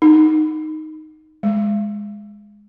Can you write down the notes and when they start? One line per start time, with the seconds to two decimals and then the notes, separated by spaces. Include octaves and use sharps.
0.02 D#4
1.43 G#3